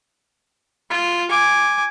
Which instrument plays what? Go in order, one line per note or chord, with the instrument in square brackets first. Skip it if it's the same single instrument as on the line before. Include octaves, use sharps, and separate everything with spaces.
[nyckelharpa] F4
G#5 D6